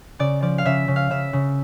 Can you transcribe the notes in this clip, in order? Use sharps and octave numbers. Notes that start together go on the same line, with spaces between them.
C#3 D5
F3 D5
F5
C#3 E5
C#3
F5
C#3 E5
C#3